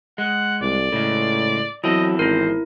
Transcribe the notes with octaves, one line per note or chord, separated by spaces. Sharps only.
G#3 F#5
C2 D5
A2 C#3 G#3
E2 F#3 C4 E4 A4 D#5
G#1 E4 A#4 C5